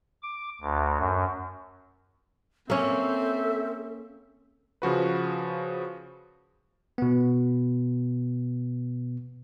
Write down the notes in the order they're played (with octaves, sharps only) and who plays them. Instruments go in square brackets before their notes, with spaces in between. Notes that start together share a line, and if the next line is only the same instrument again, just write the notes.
[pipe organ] D6
D2
F#2
[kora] A#3 C#4 [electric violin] C4 [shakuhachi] A4 [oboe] E5
[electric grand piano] C#3 F3 F#4 B4
[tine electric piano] B2 B3